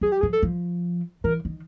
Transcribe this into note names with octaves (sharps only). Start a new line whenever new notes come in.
F#3 G#4
G4
F3 G#4
A4
F3
E3 A#4
D#3